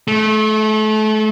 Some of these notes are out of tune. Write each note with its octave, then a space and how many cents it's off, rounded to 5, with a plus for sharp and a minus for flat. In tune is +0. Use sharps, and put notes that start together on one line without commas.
A3 -30